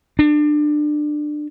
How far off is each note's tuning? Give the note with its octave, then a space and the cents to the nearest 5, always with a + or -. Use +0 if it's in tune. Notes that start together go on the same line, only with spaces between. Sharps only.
D4 +25